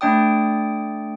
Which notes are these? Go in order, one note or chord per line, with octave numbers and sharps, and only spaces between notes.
A3 D4 D5 G5 D#6